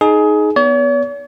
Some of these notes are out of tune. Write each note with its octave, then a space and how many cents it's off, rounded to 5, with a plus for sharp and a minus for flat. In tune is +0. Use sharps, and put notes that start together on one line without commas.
D#4 +0 G#4 +20
B3 +0 C#5 +45